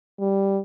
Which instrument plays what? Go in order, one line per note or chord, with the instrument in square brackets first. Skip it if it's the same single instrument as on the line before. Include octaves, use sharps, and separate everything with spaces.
[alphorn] G3